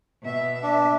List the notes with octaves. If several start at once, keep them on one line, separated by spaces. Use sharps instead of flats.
B2 E5
D4